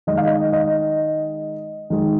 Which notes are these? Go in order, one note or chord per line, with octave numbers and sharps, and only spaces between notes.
D#3 G#3 D#5
F5
D#5
D#5
D#3 G#3